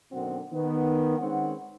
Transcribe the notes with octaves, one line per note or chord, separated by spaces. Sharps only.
F#2 B2 D3 D#3 C4 F#5
D#3 B3
D#3 G#3 C4 C#4 F#5